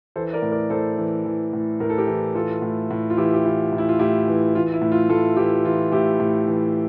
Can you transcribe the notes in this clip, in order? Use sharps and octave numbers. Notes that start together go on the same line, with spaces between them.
E3 A4 C5
A#4 D5
A2
A#4 D5
A2 A4 C5
E3
E3
A2
A2 A#4
A4
G4 A#4
E3
E3 F4 A4
A2
A2
F4
E3 E4 G4
G4
E3 F4
A2
E4
F4
A2 E4 G4
E3
E3 F4
E4
A2
F4
A2 F4 A4
E3 E4 G4
E3 F4
A2 E4 G4
A2
E3